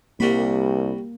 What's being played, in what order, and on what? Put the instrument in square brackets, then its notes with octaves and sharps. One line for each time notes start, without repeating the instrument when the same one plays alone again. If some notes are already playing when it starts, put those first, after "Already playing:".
[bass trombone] C2 [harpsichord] G3 F#4 B5 [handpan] A#3